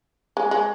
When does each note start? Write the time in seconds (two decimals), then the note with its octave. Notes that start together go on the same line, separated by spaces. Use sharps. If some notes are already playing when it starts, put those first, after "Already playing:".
0.37 G#3
0.51 G#3